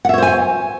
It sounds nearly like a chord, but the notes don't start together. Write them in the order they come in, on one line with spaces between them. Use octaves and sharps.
F#5 E5 C#5 C5 G#5